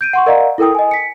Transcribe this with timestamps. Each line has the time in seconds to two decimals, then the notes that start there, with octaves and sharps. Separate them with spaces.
0.01 G6 D7 D#7
0.13 F#5 C6 C#6
0.26 A#4 D5 D#5 F5 F#5 A#5
0.58 E4 A4 A#4 G5 D#6
0.75 D#5 G#5
0.91 B6 C#7